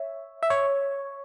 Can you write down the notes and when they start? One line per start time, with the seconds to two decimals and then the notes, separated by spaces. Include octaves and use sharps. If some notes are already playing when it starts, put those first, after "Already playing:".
Already playing: C#5 E5
0.43 E5
0.50 C#5